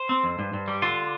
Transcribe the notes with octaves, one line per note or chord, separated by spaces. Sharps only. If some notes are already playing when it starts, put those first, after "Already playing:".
Already playing: C5
C4
F2
G2
G2
G3
D3 F4